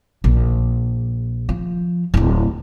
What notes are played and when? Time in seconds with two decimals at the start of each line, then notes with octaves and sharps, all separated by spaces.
0.24 A#1
1.49 F3
2.14 D1 G#1